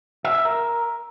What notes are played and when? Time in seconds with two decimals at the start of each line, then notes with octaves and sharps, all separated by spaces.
0.24 E5
0.35 E5
0.45 A#4